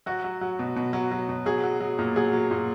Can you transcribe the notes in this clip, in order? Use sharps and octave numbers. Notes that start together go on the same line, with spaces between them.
F#3 F#4
F#3
F#3
B2
B2
F#3
F#3
B2
F#3 G#4
F#3
F#3
A#2
F#3 G#4
F#3
A#2